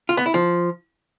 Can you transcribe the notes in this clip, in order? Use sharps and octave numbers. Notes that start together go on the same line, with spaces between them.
F4
B3
E4
F3